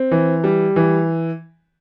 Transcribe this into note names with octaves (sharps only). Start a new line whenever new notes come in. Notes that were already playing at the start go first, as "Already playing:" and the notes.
Already playing: C4
E3
G3
E3